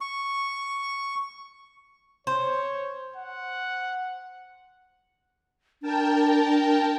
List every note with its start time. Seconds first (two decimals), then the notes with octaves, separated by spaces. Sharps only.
0.01 C#6
2.27 C5 C#5
3.16 F#5
5.82 D4 A#4 G5 A5